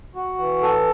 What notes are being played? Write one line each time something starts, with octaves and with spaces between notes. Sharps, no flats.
F#4
E3
A4